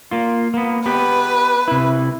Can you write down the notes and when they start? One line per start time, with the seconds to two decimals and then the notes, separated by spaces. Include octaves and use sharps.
0.11 A#3 F4
0.54 A#3 B3
0.86 B3 G4 B4
1.68 C3 E4